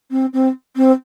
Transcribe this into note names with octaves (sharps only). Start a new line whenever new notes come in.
C4
C4
C4